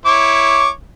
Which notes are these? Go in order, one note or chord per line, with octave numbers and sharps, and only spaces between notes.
E4 C#5 D6